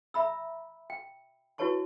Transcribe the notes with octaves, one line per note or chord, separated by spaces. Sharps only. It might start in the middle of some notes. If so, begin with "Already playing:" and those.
E5 A#5 B5 E6
G5
E4 F#4 B4 C#5 A5 C#6